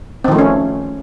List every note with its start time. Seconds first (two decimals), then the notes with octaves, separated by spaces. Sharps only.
0.24 C4
0.28 D#3
0.31 F3
0.35 A3
0.39 C#4